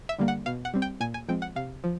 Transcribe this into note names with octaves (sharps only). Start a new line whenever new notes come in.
E5
D3 G3 A#3
F#5
B2 F5
F#5
G3 C4
G5
A#2 G#5
G#5
F3 G#3 C4 G5
F#5
C3 F5
F3